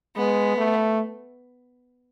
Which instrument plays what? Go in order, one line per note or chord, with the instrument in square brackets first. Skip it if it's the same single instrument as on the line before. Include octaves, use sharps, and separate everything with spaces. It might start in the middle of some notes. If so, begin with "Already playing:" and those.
[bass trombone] G#3 [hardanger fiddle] B3
[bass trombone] A3